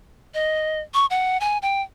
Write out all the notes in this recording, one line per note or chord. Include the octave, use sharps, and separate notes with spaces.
D#5
C#6
F#5
G#5
G5